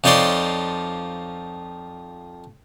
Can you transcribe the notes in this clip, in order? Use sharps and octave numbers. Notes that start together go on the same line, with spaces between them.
F2 F3 D#4 C#5 D5 C6